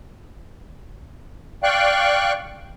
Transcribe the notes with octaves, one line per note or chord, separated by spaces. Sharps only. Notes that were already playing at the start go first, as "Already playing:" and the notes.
D5 F5 G5 C#6 F#6